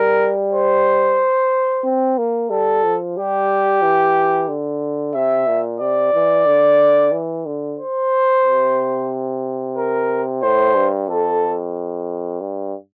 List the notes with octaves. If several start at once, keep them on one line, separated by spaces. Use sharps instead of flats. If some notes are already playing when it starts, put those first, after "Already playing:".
Already playing: G3 A#4
C5
C4
A#3
G3 A4
F3
G3 G4
E3
D3
C3 E5
A#2
C3 D5
E3
D3
E3
D3
C5
C3
A#4
A2 C5
G2
F2 A4
G2